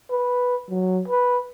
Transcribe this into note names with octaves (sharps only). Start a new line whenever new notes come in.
B4
F#3
B4